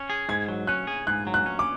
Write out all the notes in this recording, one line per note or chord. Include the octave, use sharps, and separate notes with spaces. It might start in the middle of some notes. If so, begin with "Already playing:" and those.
Already playing: C#4
G#4
G#2 G#6
F#3
C#4 F#6
G#4
G#2 F#6
F#3
F#6
C#4
D6